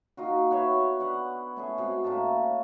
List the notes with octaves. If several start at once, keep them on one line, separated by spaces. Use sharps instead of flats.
A#3 D#4 F4 F#4
B3 F#4 C#5 E5
B3 D4 F#5
A3 C#4 G#4
G#3 C4 F#4
A2 A#3 C#4 A5